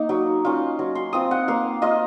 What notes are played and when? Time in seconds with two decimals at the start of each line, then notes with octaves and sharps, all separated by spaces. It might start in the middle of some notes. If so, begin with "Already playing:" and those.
Already playing: A#3 D#4
0.09 F#3
0.45 C#4 F4
0.79 F#3
0.95 C6
1.13 C4 F4 D#6
1.31 F#5
1.48 A#3 F5
1.82 F4 D#5